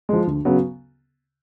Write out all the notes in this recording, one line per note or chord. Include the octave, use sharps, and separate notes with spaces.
F3 G#3
D2
C#3 F#3 B3